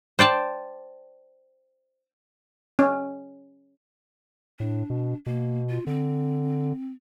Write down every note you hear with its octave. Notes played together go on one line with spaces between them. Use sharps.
C5 D5 G5 A5
C#4
A2 D4
B2
B2 A#3
F4
D3 C4